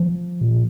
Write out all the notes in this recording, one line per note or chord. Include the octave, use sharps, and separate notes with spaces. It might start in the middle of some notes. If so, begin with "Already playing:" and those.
Already playing: F3
A#2